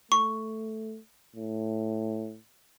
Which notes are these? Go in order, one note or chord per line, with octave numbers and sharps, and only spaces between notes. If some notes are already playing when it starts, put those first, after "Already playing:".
A3 C#6
A2